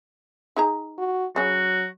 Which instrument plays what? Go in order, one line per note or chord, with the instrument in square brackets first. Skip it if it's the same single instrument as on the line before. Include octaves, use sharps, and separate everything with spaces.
[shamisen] D#4 G#4 A#5
[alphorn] F#4
[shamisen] C#3 C#4 [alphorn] F#3 [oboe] F#4